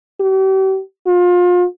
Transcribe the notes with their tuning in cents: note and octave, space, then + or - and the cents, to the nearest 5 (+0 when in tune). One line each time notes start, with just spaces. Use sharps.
G4 -40
F4 +30